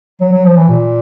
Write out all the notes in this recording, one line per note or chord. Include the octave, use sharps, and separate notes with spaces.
F#3
F#3
F3
E3
A#2